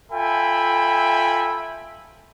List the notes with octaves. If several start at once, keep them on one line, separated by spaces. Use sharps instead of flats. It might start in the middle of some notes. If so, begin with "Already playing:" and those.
F4 A4 E5 G5 G#5 B5